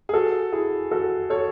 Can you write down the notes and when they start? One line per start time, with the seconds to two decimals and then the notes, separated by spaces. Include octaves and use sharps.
0.09 G#4
0.14 F#4 A4
0.52 E4 G#4
0.91 F#4 A4
1.30 A4 C#5